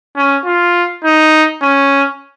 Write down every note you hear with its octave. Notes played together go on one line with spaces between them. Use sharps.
C#4
F4
D#4
C#4